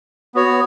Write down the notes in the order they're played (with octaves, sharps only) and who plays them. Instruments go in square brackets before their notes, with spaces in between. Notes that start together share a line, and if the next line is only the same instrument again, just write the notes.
[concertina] B3 F#4 C#5